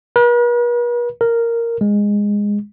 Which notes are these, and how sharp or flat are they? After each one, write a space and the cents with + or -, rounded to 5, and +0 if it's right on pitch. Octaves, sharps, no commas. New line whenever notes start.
B4 -45
A#4 -5
G#3 -15